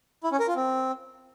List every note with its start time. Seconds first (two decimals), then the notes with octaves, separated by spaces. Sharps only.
0.24 E4
0.32 C#4
0.40 A#4
0.48 F4
0.56 C4